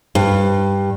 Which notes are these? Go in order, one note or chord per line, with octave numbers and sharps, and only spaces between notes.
G2